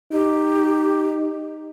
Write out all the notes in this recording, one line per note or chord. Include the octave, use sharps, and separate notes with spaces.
D#4 G4